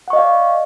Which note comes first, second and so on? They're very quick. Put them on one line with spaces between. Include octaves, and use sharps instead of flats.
F#5 C#6 D#5 F5 D5